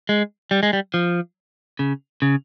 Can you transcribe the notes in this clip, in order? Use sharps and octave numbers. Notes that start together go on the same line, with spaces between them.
G#3
G3
G#3
G3
F3
C#3
C#3